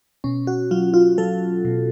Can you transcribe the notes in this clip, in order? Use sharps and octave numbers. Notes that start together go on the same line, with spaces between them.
B2 C#4
F#4
F#3 F4
F4
F#3 A4
B2